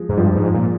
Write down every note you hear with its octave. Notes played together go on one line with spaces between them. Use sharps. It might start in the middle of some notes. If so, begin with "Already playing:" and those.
Already playing: F3 G#3
G#2
G2 F3
G#2
A#2